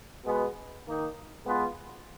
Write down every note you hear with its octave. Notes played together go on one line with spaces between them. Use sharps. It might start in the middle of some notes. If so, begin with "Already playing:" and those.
B2 G#3 B3
D#3 A#3 D#4
G#3 B3 F4 B4